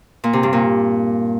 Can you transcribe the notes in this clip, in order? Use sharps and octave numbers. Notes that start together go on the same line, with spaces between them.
A#2
C3
G2
A#2